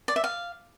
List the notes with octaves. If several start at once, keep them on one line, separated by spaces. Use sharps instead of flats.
D5
E5
F5